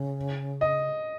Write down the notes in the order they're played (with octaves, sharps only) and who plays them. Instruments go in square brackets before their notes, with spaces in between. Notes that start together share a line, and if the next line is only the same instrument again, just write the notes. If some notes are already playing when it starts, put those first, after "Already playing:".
Already playing: [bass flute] C#3
[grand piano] D#5